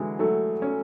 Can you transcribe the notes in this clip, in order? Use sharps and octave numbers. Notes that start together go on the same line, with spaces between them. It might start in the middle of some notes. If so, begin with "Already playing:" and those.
Already playing: D3 E3 F#3 G#3
F#3 A3
C#4